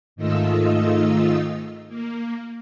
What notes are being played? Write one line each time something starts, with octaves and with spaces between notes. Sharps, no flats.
G#2 D#3 A3 F4 D#5 E6
A#3